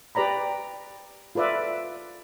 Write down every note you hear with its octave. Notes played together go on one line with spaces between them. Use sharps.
G4 B4 D5 A#5 B5
F4 A4 B4 D5 E5